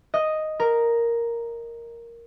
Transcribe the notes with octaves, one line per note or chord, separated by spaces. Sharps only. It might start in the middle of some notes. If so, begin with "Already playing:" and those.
D#5
A#4